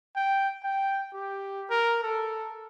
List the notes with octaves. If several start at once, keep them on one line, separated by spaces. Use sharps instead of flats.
G5
G5
G4
A#4
A4